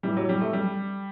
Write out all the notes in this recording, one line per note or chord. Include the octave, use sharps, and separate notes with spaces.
A2 E3 G3
F#3
G3
A3
G3